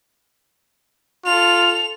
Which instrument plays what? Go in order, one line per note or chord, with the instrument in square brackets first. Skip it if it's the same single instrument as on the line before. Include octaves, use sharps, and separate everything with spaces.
[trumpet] F4 [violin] A4 F7